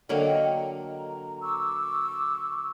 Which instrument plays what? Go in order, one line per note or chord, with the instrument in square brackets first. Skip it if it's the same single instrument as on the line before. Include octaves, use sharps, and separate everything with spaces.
[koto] D3 F#3 A#3 [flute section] D#5 G5
[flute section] A#5
C#6 D6 E6